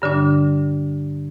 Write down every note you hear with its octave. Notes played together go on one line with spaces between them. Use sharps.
G2 D3 G3 D4